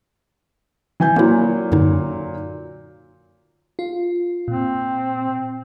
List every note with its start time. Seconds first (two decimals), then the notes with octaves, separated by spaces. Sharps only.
1.00 E3 G#5 G6
1.16 A#2 F#3 A#3 E4
1.72 F#2 D3 D#4
3.79 F4
4.48 A#2 C4